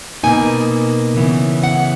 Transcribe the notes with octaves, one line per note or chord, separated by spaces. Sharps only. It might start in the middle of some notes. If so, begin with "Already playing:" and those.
B2 A#3 D#4 G#5
C#3 E3 B3
F#5